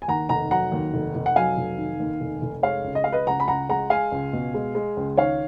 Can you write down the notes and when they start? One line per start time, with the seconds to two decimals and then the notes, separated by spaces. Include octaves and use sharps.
0.02 G#5
0.08 D#2 F#5 A#5
0.29 F1 F#5 A#5
0.51 F#3 F#5 A#5
0.72 D#2
0.94 F1
1.15 F1
1.26 F#5
1.36 F#3 F5 G#5
1.58 F1
1.78 D#3
2.00 D#2
2.21 F1
2.42 F1
2.63 G#3 C#5 F5
2.84 C#2
2.95 D#5
3.04 G#3 F5
3.12 B4 D#5
3.27 C#2 F#5 A#5
3.40 B5
3.48 C#2 F#5 A#5
3.69 G#3 F#5 A#5
3.90 G#3 F5 G#5
4.12 C#2
4.33 B2
4.54 G#3
4.75 G#3
4.97 C#2
5.17 D#3 C#5 F5